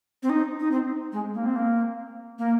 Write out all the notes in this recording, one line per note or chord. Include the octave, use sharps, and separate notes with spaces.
C4
D#4
D#4
C4
G#3
A#3
C4
A#3
A#3